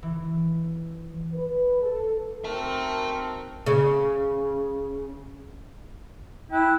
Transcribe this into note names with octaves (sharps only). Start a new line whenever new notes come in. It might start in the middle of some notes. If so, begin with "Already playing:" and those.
E3
B4
A4
C4 D#4 F#4 A#4 E5 A5
C#3
E4 G5 F#6